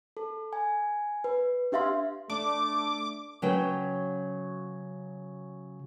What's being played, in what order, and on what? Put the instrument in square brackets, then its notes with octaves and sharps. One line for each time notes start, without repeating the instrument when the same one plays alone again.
[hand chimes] A4
G#5
B4
D4 G4 E5 F5 C6
[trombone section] A3 [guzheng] D4 [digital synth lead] D6
[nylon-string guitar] C#3 F#3 B4 G5